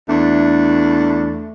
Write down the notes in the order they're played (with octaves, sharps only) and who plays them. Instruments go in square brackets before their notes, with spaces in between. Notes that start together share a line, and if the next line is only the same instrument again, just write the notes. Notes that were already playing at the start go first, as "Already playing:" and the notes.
[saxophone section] E2 A3 D4